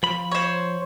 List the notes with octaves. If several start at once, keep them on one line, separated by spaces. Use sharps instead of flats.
F3 B5
C5 C#5